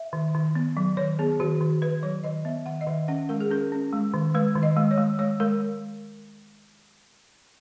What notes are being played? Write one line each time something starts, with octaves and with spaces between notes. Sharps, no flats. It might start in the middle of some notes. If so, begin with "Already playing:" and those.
Already playing: E5
D#3
D#3
B3
F#3
D#3 C#5
B3 G#4
D#3 F#4
D#3
D#3 B4
F#3 C#5
D#3 D#5
B3 E5
D#3 F#5
D#5
D#3 E5
C#4 F#5
G#3 A#4
G#4
C#4 A#4
C#4
G#3
D#3
G#3 B4
D#3
D#5
G#3
C#5
G#3
G#3 C#5
G#3 A#4